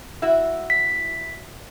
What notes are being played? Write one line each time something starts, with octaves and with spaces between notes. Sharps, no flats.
E4 F#4 E5
B6